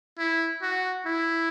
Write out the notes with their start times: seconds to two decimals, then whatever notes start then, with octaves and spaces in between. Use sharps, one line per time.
0.19 E4
0.62 F#4
1.06 E4